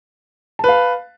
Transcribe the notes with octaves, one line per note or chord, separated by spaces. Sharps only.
B4 F5 A5